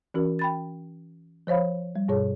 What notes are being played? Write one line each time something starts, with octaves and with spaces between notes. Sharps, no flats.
E3 C#4 F#4 A#4
G5 B5 A6
F3 C5 C#5 F5 B5
G3
G2 B2 G#4 C#5